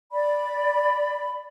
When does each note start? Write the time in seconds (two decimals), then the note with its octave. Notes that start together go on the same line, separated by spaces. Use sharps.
0.12 D5 B5